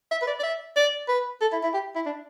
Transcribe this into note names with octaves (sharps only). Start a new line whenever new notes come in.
E5
B4
D5
D5
E5
D5
B4
A4
E4
E4
G4
E4
D4